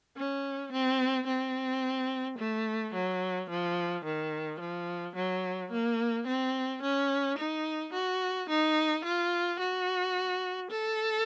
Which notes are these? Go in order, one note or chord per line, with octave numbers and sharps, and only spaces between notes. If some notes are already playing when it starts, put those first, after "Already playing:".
C#4
C4
C4
A3
F#3
F3
D#3
F3
F#3
A#3
C4
C#4
D#4
F#4
D#4
F4
F#4
A4